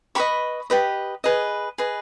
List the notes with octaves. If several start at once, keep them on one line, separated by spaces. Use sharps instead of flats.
G4 B4 D#5 B5 C#6
G4 B4 D#5
G#4 B4 D#5
G#4 B4 D#5